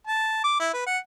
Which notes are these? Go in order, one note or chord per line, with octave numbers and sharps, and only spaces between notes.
A5
D6
E4
B4
F#5